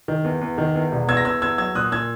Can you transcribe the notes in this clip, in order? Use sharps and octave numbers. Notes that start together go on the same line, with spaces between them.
D#3
E2
E2
D#3
E2
E1
E2 E6 G#6
A#6
E2 E6 G#6
E2 E6 G#6
F#3 E6 G#6
A#2 D#6 F#6
A#2 E6 G#6